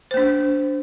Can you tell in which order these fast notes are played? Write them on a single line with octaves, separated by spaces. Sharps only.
C5 A#3 D4